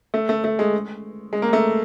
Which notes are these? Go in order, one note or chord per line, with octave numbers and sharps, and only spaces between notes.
A3
A3
A3
G#3
G#3
A#3
A3